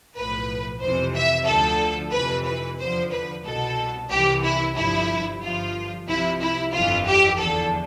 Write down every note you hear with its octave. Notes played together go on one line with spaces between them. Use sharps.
B1 A2 F3 B4
F2 C3 E3 C5
E5
D2 D3 F3 A4
F2 C3 E3 B4
B4
E2 D3 F3 C5
B4
C2 B2 A4
C2 C3 E3 G4
E4
G1 G2 F3 E4
G1 G2 F3 F4
C2 C3 F3 E4
E4
G1 F2 E3 F4
G4
E2 D3 F3 A4